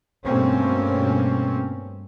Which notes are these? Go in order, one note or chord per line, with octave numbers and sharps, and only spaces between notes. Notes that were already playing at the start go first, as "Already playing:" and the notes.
G2 B2 A3 A#3 C4 C#4